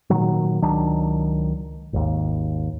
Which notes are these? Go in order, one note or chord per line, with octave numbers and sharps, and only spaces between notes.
A#2 D#3 F#3
C#2 D#3 F#3 D4
G#1 D#2